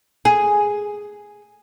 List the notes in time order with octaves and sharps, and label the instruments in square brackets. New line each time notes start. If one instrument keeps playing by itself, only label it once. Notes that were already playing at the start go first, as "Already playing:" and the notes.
[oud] G#4